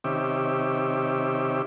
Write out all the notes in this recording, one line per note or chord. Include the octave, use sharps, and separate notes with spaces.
C3 D#3 C#4 G4 E5 D6